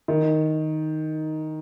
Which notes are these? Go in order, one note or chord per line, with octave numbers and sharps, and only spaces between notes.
D#3